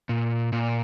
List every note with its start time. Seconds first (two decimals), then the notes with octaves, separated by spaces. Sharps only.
0.09 A#2
0.53 A#2